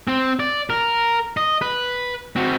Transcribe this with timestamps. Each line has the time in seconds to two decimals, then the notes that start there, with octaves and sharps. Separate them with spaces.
0.08 C4
0.39 D5
0.70 A#4
1.37 D#5
1.61 B4
2.36 C4 F#4